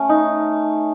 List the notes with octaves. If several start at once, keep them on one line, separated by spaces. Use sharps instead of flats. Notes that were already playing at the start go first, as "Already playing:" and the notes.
Already playing: A3 C#4
D#4